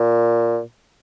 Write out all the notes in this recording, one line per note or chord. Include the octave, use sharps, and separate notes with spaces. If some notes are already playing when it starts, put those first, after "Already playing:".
Already playing: A#2